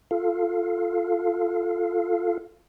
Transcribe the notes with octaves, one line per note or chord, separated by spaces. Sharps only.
F4 A4 F5